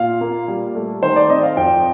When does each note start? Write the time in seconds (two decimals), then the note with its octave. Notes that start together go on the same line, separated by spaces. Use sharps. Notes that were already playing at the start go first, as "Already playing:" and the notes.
Already playing: A#2 F4 F5
0.21 A#3
0.48 G3
0.75 A3
1.03 D#3 C5
1.16 D5
1.29 C4 D#5
1.43 F5
1.57 F2 G5